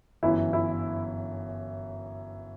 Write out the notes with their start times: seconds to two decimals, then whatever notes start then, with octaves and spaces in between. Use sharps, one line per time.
0.23 G1 F#2 E3 E4
0.53 E4